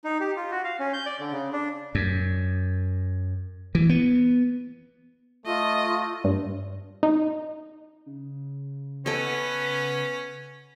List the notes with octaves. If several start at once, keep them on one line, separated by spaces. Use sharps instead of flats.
D#4
G4
F4
F#4
F5
C#4
G6
D5
D3
C#3
D4
F#2
E3
B3
A3 F4 D#5
G2
D#4
C#3
B3 C#4 A4 B4 D#5